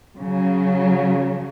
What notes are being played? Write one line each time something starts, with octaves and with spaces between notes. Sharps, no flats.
C#3 F#3